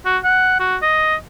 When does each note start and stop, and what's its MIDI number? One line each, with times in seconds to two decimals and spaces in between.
0.05 0.18 66
0.24 0.58 78
0.60 0.76 66
0.82 1.15 75